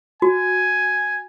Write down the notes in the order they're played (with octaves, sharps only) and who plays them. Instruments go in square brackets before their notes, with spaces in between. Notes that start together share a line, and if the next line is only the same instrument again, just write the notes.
[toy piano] F#4 [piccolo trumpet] G#5